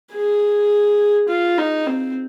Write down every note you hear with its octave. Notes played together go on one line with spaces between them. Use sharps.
G#4
F4
D#4
C4